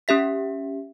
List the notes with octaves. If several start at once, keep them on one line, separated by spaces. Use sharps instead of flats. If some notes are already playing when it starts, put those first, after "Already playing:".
C#4 G4 E5 B6